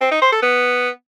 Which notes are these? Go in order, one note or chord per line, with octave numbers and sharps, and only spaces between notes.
C4
D#4
C5
A4
B3